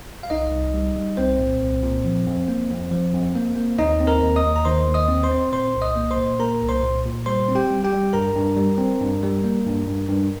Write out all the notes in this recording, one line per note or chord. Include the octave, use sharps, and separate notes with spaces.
F5
C2 D#4 D#5
C2
G3
G3
C2 C4 C5
A#2
C2
A#2
F3
F2
A#3
F2
F3
F2
A#3
A#3
D#2 D#4 D#5
C4
A#4 A#5
D#2
D#5 D#6
D#2
A#5
D#3 C5 C6
D#2
D#5 D#6
C4
C5 C6
C4
A#2 C5 C6
C2
D#5 D#6
A#3
C5 C6
A#2
A#3 A#4 A#5
C2
C5 C6
A#2
A#2
G3 C5 C6
C4
G4 G5
G3
G4 G5
G3
G2 A#4 A#5
G2
G3
C4
G2
G3
A#3
G2
G2
G2